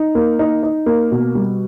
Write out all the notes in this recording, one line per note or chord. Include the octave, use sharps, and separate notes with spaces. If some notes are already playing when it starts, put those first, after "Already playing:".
Already playing: D#4
A#3
D#4
D#4
A#3
B2
G3